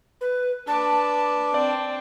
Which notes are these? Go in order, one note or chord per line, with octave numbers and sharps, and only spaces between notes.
B4
D4 B4 A5 D6
C4 D5